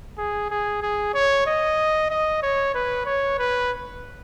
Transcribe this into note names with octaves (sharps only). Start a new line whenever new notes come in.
G#4
G#4
G#4
C#5
D#5
D#5
C#5
B4
C#5
B4